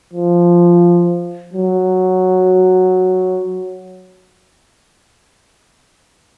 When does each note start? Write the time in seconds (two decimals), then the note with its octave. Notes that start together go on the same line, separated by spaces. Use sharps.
0.14 F3
1.53 F#3